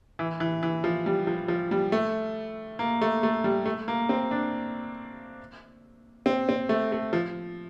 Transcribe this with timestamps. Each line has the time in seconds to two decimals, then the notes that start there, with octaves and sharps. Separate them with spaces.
0.19 E3
0.40 E3
0.63 E3
0.84 F3
1.06 G3
1.27 F3
1.48 F3
1.71 G3
1.92 A3
2.79 A#3
3.01 A3
3.23 A3
3.44 G3
3.66 A3
3.88 A#3
4.09 C4
4.31 D4
6.26 C4
6.49 C4
6.69 A3
6.92 A3
7.13 F3